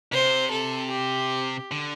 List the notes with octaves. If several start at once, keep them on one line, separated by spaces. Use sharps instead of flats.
C3 C5
A4
G4
D3